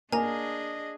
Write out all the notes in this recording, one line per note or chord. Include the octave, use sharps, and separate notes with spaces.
A#3 D4 G#4 D#5 G#5 A#5